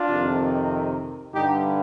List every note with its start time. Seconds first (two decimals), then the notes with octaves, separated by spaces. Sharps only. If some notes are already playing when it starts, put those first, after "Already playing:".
Already playing: D4 F4
0.10 F2 C3 D#3
1.34 G2 D3 D#4 G4